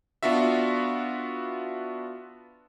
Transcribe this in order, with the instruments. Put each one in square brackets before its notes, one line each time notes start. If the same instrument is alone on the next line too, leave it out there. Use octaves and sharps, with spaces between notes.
[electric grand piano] B3 D4 F4 F#4 E5